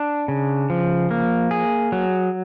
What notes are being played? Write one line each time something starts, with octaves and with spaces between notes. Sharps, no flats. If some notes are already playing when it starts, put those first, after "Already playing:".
Already playing: D4
C#3
F3
A#3
G#4
F#3